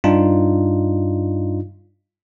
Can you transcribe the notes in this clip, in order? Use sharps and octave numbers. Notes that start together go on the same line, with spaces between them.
G2 D4 D#4 F4